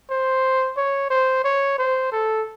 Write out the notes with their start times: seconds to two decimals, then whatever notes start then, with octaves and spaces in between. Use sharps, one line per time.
0.10 C5
0.77 C#5
1.10 C5
1.44 C#5
1.78 C5
2.12 A4